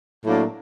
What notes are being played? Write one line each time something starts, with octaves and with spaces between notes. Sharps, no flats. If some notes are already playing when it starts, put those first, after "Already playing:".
A2 F#3 A#3 D4